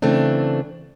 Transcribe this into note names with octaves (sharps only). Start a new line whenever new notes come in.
C#3 E3 A3 C4 D4